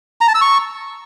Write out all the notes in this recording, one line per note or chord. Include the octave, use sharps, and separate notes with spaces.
A#5
A5
E6
C#6